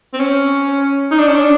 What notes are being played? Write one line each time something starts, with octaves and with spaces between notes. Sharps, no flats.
C4
C#4
D#4
D4
C#4
D4